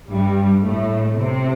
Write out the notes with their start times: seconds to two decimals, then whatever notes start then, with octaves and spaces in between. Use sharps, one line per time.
0.10 G2 G3
0.63 A2 A3
1.16 C3 C4